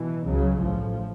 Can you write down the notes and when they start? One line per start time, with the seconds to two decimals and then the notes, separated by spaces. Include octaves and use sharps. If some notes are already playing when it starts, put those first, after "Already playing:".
Already playing: B2 E3
0.25 C#2 C#3 F#3
0.58 A1 A2 F3